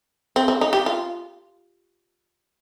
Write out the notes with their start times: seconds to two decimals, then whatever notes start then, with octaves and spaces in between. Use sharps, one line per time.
0.36 C4
0.48 C4
0.61 D#4
0.73 G4
0.86 F4